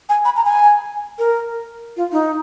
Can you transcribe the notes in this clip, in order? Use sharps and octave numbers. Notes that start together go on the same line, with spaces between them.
G#5
B5
A#5
G#5
A#4
F4
D#4